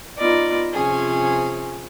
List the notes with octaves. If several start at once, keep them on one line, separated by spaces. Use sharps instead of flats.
B3 D#4 F4 D5 D#5
C3 F3 C#4 G#4